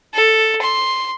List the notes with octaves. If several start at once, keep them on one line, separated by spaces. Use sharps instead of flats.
A4
C6